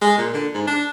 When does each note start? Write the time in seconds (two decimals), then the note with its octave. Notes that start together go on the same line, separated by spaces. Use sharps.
0.01 G#3
0.18 A#2
0.33 D3
0.54 G#2
0.67 D4